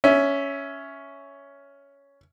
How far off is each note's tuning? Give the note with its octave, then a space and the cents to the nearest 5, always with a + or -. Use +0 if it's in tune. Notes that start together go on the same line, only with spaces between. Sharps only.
C#4 +10 E5 +0